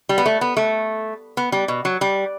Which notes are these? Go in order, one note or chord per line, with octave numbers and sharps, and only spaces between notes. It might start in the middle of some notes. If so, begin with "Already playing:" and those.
G3
B3
A3
B3
A3
B3
G3
B2
F#3
G3